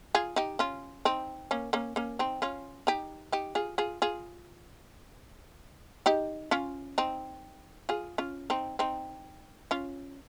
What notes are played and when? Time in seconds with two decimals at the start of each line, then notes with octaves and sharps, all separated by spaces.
0.15 F4 G#4
0.36 D#4 G4
0.59 C#4 F4
1.05 C4 D#4
1.51 A#3 C#4
1.73 A#3 C#4
1.96 A#3 C#4
2.19 C4 D#4
2.42 C#4 F4
2.87 D#4 G4
3.32 D#4 G4
3.55 F4 G#4
3.78 F4 G#4
4.02 F4 G#4
6.06 D#4 G4
6.51 C#4 F4
6.98 C4 D#4
7.89 F4 G#4
8.18 C#4 F4
8.50 C4 D#4
8.79 C4 D#4
9.71 C#4 F4